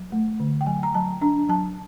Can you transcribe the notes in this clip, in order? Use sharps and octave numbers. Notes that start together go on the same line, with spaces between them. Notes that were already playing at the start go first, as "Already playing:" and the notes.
Already playing: F#3
A3
D3
G5
F#3 G#5
A#5
F#3 A5
D4 A#5
F#3 A5